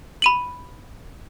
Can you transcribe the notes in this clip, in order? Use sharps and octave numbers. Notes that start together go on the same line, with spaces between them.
B5 D#7 F#7